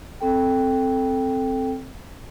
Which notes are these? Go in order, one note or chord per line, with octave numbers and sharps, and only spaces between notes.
C4 A4 G5